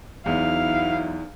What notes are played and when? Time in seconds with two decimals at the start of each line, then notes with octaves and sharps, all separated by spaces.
0.26 E2 F#3 B3 D#4 E4 F5